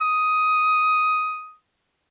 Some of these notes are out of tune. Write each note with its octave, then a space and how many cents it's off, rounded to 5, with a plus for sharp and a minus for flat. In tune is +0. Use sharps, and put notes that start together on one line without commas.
D#6 +10